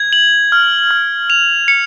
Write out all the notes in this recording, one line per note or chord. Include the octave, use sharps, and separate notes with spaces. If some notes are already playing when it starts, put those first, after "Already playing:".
Already playing: G#6
F#7
F6
F6
F7
C#7